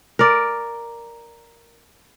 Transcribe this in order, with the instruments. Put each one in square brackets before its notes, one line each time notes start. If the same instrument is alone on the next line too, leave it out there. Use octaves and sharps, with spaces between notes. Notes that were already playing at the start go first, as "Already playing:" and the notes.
[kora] A#4 D5